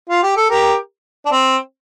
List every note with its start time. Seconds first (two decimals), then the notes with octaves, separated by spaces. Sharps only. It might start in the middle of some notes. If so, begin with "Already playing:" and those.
0.09 F4
0.23 G4
0.37 A4
0.50 G4 A#4
1.26 D4
1.32 C4